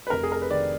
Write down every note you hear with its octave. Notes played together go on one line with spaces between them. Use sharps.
B4
F1 A#4
G#4
A#4
B4
D#3 D5